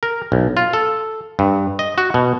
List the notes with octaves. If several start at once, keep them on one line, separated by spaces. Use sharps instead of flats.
A#4
B1
F4
A4
G2
D#5
F#4
B2